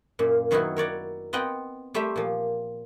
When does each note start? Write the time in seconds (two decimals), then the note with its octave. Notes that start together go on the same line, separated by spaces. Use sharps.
0.19 F#2 A#2
0.51 D#3 F#3 B3 D#4 E4 F#4
0.76 A#4 C#5 D5 F#5
1.33 B3 C4 D#5 F#5 G5
1.94 G3 A3 G4 C5 E5
2.16 A#2 F3